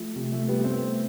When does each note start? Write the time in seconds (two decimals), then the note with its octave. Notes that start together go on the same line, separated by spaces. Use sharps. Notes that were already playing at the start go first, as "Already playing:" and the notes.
Already playing: F3 A3
0.16 C3
0.32 F3 A3
0.48 G3 B3
0.64 A3 C4